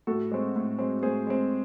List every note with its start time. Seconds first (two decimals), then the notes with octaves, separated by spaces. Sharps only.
0.07 A2 F#4 A4
0.31 G#3 C4
0.56 A2
0.79 G#3 C4
1.03 A2 G#4 C5
1.27 G#3 C4